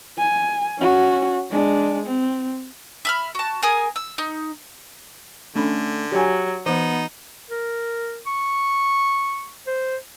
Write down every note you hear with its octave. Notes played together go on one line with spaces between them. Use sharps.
G#5
C#4 F#4
G#3 D4
C4
E5 B5 F6
F#4 A5
G#4 A#4 G#5 D#6
E6
D#4
D3 A3 C#4 D4 B5
F#3 G4 D5 G#5
E3 B3 D#4 C5
A#4
C#6
C5